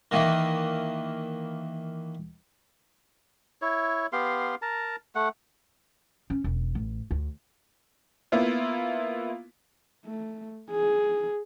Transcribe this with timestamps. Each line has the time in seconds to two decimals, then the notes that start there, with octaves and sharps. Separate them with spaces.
0.11 D#3 E3 A#3
3.62 E4 C#5
4.13 B3 G4 F5 C6
4.62 A#4 A5 A#5
5.15 A3 F#5
6.30 C#4
6.44 E1
6.75 A1
7.11 D2
8.32 A#3 B3 E4 F4
10.06 A3
10.71 G#4